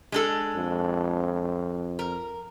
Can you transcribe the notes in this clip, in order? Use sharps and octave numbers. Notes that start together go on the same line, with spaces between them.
G#3 D4 A4
F2
A#4